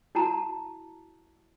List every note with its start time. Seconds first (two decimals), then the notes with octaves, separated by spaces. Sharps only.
0.15 E4 F#4 A5 A#5